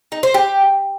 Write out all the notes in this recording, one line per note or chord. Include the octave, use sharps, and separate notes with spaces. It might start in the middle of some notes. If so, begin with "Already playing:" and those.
D#4
C5
G4